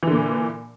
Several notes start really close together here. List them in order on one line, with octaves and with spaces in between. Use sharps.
E3 D3 A#2